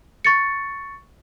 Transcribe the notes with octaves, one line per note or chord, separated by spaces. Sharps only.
C#6 A6 C#7